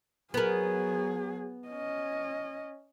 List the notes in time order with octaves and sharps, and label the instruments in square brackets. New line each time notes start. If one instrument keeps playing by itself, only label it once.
[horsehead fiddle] F#3 G#4 [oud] B3 A#4
[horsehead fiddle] C#4 D#5